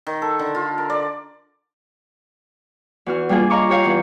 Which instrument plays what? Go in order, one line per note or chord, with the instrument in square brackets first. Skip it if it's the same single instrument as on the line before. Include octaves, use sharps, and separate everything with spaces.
[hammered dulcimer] D#3
A4
D3
F4
A#4
D5
[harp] E2 F#4 F6
G3 A#3 D4 F4 G#4
C#5 D#5 F5 A#5 C#6 D6
G4 C#5 F5
E2